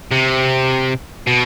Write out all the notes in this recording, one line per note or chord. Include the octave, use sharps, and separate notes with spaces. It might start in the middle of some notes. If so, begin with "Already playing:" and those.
C3
B2